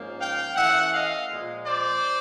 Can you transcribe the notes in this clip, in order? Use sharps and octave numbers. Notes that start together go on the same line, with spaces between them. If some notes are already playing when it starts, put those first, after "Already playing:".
Already playing: G#2 F3 A#3 C#4
F5 G5
E3 A3 C#4 E5 F#5
D#5 F5
A#2 F3 G#3
C5 D5